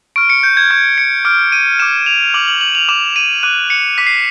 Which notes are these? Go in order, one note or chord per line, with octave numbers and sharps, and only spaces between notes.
C#6 F6 D7
C#7
G6
G#6
C#6 F6 G#6
C#7
D6 F6 D7
D#7
D6 F6 E7
F7
D6 F6 F#7
F#7
F#7
F7
D6 F6 E7
D#7
D6 F#6 D#7
C#7
D6 F#6 B6
C7